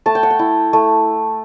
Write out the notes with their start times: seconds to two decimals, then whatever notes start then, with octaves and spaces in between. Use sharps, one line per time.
0.06 A3 A5
0.15 G5
0.23 F#5
0.30 G5
0.39 E4
0.73 A3